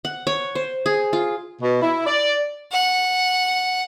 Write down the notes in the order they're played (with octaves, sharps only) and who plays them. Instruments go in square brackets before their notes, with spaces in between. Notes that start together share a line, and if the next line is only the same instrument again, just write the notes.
[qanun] F#5
C#5
C5
G#4
F4
[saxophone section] B2
E4
D5
[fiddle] F#5